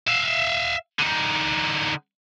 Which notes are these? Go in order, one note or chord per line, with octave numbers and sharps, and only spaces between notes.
E5 F5
D3 D#4